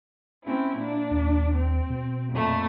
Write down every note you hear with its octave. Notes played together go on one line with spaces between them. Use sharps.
C4 C#4 E4
A#2 D4
D#2
C4
B2
F2 A#2 A3